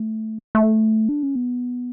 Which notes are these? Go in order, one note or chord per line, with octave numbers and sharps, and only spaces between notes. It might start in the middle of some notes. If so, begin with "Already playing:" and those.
Already playing: A3
A3
D4
C#4
B3